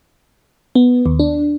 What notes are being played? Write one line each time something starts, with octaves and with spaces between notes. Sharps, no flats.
B3
D#2
D4